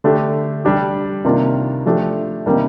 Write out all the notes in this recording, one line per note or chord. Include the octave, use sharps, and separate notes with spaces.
D3 A3 D4 G4
G3 D4 G4
C3 D#3 A#3 D4 F4
F3 A3 D4 G4
C3 D#3 G3 A#3 D4